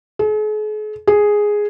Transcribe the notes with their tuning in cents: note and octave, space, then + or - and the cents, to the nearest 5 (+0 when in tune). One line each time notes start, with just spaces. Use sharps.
G#4 +45
G#4 +0